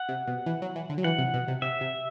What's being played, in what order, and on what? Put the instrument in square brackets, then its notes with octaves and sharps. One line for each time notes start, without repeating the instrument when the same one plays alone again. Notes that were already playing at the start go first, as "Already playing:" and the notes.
Already playing: [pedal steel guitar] F#5
[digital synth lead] C3
B2
E3
F#3
E3
D3
F#3
[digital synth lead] E3 [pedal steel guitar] F#5
[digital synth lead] C3
B2
C3
[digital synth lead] C3 [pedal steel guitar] E5
[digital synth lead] C3